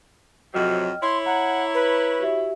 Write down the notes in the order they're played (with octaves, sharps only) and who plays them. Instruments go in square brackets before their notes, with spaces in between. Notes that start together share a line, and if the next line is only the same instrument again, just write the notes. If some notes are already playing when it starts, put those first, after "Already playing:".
[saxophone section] F2 C3 F#3 [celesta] D#5 G5 F6
[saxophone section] E4 C#5 [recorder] C6
[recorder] F#5 [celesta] A#5
[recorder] B4
[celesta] F#4 G4 E5